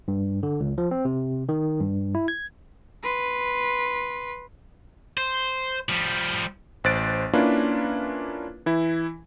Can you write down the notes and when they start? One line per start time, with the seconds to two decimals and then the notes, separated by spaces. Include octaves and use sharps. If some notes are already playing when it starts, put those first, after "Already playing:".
0.08 G2
0.43 D3
0.60 C#2
0.78 F3
0.91 C4
1.05 C3
1.49 D#3
1.81 G2
2.15 E4
2.28 G#6
3.03 B4 C6
5.18 C5
5.89 F3 G3
6.84 A1 C5 F#6 A6 D7
7.33 A#3 C#4 D4 E4 F4 B4
8.66 E3 E4